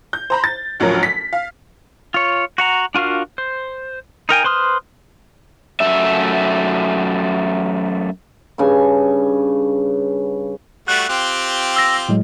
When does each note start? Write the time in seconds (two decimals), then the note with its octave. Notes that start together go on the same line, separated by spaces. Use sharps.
0.13 G6
0.30 C5 A#5 B5
0.44 A6
0.80 A1 D2 F3 F#3 A#4
1.03 B6
1.33 F5
2.14 F4 C#5
2.58 F#4 F#5 A#5
2.95 D4 F4 F#4 A#4 F5
3.38 C5
4.29 D#4 A#4 G5 G#5
4.44 B4 C5 C6 D#6 F6
5.80 F#2 A3 E5
8.58 G2 C#3 G#5
10.88 G3 A3 F#4 F#6
11.09 C4 F4 G4
11.76 E6 A#6
12.09 A2 F#3 G#3